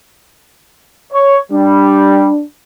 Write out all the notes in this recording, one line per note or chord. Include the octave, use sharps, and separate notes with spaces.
C#5
G3 D4